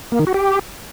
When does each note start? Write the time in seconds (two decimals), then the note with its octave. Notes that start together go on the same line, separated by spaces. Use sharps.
0.12 A#3
0.19 D#3
0.27 F#4
0.34 G4